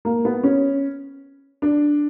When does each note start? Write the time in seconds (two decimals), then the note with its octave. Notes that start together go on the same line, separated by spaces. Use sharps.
0.05 A#3
0.25 B3
0.43 C#4
1.62 D4